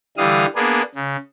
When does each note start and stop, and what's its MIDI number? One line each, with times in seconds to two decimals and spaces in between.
0.17 0.46 50
0.17 0.46 52
0.17 0.46 55
0.17 0.46 77
0.17 0.46 87
0.55 0.82 58
0.55 0.82 59
0.55 0.82 62
0.55 0.82 68
0.95 1.17 49